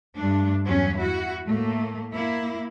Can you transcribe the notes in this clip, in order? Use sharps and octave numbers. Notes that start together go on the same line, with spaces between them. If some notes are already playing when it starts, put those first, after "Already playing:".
G2 A3 D4
E2 G2 F#3 C#4
E4 F#4
A2 A3 A#3
A#3 E4